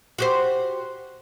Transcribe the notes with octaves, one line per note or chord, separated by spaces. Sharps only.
F#4 G4 C5